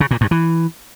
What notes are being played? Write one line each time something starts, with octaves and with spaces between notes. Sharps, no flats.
C#3
A#2
G2
E3